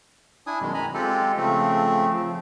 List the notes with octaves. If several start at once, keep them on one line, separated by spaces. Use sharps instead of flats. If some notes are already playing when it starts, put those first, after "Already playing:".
D4 E4 G#5 D#6
F#2 B2 D#3 G#3
G#5 A#5 B5
G#3 C4 F4 G4 A4
C#3 F3 A3 C4
F3